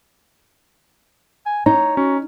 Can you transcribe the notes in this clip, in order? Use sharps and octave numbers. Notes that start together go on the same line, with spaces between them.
G#5
D#4 C#5 A#5
C#4 F#4